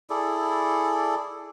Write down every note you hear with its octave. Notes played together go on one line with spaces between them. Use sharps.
E4 G#4 A4 D5